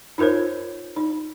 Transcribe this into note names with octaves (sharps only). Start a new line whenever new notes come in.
D#4 F4 A#4 C5 C#5
D#4